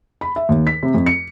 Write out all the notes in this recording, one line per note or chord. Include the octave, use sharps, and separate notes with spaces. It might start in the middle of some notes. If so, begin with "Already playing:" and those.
B5
E5
D#2
B6
C3
F2
C#7